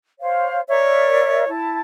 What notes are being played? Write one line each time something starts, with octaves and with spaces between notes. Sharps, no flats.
C5 C#5 F5
A#4 C#5 D5 E5
E4 A5